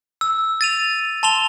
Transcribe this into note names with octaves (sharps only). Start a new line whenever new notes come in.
E6
A6 D#7 F7
A5 C6 F7 G7